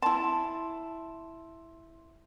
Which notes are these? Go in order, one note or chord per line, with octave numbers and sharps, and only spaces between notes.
E4 A5 C6